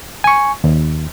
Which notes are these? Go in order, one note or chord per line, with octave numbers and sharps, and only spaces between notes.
G#5 C#6
D#2